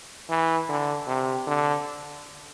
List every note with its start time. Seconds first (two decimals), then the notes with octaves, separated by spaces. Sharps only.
0.30 E3
0.69 D3
1.07 C3
1.47 D3